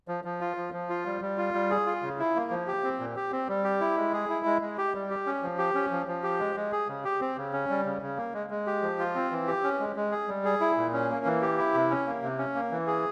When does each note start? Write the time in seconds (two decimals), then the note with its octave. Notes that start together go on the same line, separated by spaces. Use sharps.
0.08 F3
0.24 F3
0.41 F4
0.57 F3
0.73 F3
0.89 F4
1.06 G3
1.22 G3
1.37 F4
1.54 G3
1.70 G#4
1.86 F4
2.03 C#3
2.19 E4
2.36 A#3
2.51 F3
2.67 G4
2.84 C4
3.00 A#2
3.16 G4
3.32 C4
3.48 G3
3.64 G4
3.81 E4
3.97 G#3
4.13 G#4
4.29 E4
4.46 G#3
4.62 G#3
4.78 G4
4.94 G3
5.10 G4
5.26 C#4
5.43 F3
5.58 G4
5.75 C#4
5.91 F3
6.08 F3
6.23 G4
6.40 G#3
6.56 G#3
6.72 G#4
6.88 C#3
7.05 G4
7.21 C4
7.37 C#3
7.53 C#4
7.69 G3
7.85 C#3
8.02 C#3
8.17 A#3
8.34 G#3
8.50 G#3
8.67 G4
8.82 F3
8.99 F4
9.15 C4
9.31 E3
9.47 G4
9.63 C#4
9.80 G#3
9.96 G#3
10.12 G#4
10.28 G3
10.45 G#4
10.61 E4
10.77 A#2
10.93 C#4
11.10 A#3
11.25 E3
11.42 G4
11.58 E4
11.74 C3
11.90 C#4
12.07 A#3
12.23 C3
12.38 C#4
12.55 A#3
12.71 E3
12.87 G#4